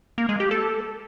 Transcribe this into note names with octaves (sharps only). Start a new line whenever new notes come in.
A#3
G#3
G4
A4